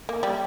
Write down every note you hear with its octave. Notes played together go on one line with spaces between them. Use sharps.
A#3
G3